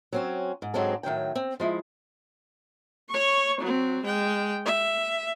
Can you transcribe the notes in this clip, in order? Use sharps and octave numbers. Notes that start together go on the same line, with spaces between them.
F#3 C4 C#4
G#2
G#2 D3 F#3 G#3 C4 A4
A2 D#3 F#3 G5
C4
F3 G#3 E4
C#5 C#6
F#3 C4
G#3 G5
E5